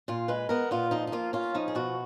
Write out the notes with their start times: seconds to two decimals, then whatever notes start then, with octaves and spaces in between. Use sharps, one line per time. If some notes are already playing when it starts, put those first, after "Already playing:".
0.08 A#2 F4
0.28 G#3 B4
0.49 B3 A#4
0.71 A#2 F4
0.91 F3 D#4
1.07 D#4
1.12 A#3 F4
1.33 C#4 F4
1.54 F3 D#4
1.68 G#4
1.75 B2 F#4